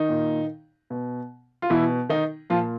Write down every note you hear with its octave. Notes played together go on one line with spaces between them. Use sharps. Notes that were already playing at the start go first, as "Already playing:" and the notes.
Already playing: D#3 D#4
A#2
B2
F4
B2 E3 E4
D#3 D#4
A#2 F3 F4